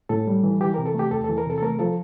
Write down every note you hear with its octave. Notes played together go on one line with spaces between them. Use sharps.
A2 A4
G3
E3
E3 G4
C3 A#4
A4
A3 G4
E2 A4
E3 A4
A#4
C3 A4
A4
A3 A#4
F3 A4